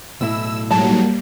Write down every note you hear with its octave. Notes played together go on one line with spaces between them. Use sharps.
B1 A2 E4 E6
G#2 F#3 G3 A#3 A5